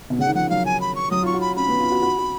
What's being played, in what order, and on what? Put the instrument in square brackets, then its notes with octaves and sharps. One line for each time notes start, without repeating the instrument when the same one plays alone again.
[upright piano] B2
[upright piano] C#3 [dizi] F#5
[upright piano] D#3
[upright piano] F3 [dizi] F#5
[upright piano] F#3 [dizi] F5
[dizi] G#5
B5
C#6
[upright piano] F#3 [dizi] D#6
[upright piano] F4 [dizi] C#6
[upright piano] F#4
[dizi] B5
[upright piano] C#4 [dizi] B5
[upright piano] B3
F4
F#4
F#4
F#4